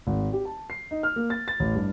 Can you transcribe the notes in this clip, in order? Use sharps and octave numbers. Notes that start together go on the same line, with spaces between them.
G#1
G4
A5
C7
D#4
F6
A#3
A6
A6
A1
G2